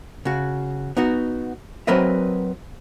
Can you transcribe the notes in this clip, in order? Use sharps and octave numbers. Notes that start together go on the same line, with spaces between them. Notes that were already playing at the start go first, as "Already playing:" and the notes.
C#3 F#4
B3 D#4 F#4
F#3 C4 A#4 B4 D#5 E5